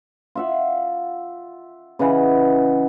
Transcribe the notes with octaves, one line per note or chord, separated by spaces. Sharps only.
F4 E5 F#5
C#3 E3 D#5 F#5